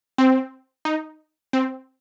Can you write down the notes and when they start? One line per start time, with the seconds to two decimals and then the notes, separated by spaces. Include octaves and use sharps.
0.18 C4
0.85 D#4
1.53 C4